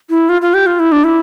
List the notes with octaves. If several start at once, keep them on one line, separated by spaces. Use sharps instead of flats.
E4
F4
F4
G4
F4
E4
D4
E4